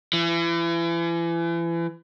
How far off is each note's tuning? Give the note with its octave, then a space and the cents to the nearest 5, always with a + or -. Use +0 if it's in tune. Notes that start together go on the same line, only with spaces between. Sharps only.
E3 +35